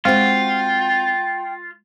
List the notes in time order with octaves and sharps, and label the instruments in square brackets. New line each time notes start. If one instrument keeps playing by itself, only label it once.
[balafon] G#3 [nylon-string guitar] C4 F#4 [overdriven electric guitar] F4 [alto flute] G5